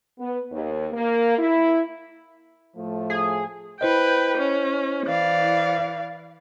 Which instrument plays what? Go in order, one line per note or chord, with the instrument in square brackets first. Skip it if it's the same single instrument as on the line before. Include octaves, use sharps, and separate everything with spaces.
[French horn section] B3
D#2
A#3
E4
A2 F3 A3
[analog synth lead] G#4
[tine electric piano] E4 C5 D#5 [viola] B4 G5
[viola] C#4
[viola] E3 [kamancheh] D5 F5